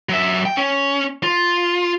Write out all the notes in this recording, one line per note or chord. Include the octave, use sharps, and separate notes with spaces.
F#3 E5
G5
C#4
F4